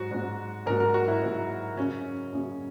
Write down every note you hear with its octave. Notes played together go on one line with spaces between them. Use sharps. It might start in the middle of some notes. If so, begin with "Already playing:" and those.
Already playing: G#2 F#3 F#4
G#2 F#3
G#2 F#3 A#4
A#4
F#4
E4
G#2 F#3
F#2 C#3 F#3 C#4
F#2 C#3 F#3